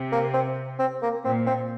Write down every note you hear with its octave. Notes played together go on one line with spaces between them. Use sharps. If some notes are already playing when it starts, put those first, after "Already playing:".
Already playing: C3
A#3
C4
C4
A#3
A#2 C4
C4